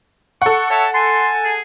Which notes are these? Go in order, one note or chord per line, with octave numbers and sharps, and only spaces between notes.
A4 F#5 C#6
C#5 E5 A5
G#5 A5 C6
G#4